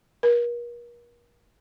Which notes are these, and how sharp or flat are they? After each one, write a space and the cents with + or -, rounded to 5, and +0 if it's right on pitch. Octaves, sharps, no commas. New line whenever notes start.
A#4 +40